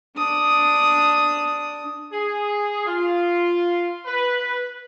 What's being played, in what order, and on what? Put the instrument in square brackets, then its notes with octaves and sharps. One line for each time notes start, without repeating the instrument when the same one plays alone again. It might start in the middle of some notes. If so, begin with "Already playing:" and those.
[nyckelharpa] D4 D#6
[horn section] G#4
F4
B4